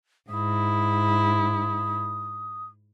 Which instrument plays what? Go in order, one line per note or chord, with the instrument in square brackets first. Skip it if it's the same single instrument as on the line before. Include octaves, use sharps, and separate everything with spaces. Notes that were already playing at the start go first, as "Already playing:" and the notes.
[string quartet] G#2 E4 [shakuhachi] D#6